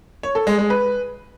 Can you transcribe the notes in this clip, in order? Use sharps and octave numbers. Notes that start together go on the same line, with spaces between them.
C#5
A4
G#3
G#3
B4